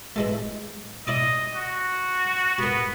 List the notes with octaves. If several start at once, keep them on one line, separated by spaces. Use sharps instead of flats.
E3 G#3 A3
E4 D5 D#5 D#6
F#4
B3 F#4 A#4